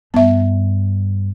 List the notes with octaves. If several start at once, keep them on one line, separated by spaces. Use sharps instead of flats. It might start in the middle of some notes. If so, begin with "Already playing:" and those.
G2 B3 E5